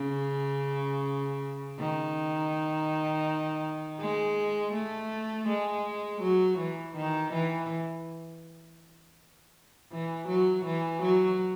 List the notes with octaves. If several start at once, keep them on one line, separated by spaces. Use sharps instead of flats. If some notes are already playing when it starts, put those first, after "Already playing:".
Already playing: C#3
D#3
G#3
A3
G#3
F#3
E3
D#3
E3
E3
F#3
E3
F#3